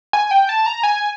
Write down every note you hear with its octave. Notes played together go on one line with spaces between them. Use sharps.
G#5
G5
A5
A#5
G#5